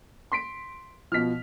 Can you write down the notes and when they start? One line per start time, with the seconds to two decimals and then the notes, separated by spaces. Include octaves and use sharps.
0.32 C6 B6 D7
1.12 B2 F3 F6 B6